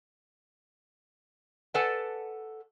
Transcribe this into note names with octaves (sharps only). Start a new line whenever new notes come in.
A4 B4 D5 F#5 G#5 A5